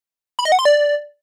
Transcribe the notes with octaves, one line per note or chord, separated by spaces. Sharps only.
B5
D#5
F#5
C6
D5